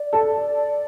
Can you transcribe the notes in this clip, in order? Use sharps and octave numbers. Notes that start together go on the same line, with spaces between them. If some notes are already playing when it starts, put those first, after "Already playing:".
Already playing: D5
A4